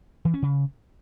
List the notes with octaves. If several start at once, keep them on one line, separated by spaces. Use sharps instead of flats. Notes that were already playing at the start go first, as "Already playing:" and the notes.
E3
C#4
C#3